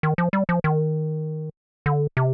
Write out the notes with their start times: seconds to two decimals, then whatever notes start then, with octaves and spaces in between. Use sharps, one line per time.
0.03 D#3
0.18 F3
0.33 G3
0.49 F3
0.64 D#3
1.86 D3
2.17 C3